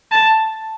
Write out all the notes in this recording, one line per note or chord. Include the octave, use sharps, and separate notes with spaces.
A5